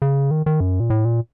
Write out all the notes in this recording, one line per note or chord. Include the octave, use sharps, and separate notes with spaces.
C#3
D#3
D#3
F#2
A#2
A2
A#2